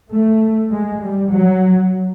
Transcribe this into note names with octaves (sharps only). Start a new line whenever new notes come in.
A3
G#3
G3
F#3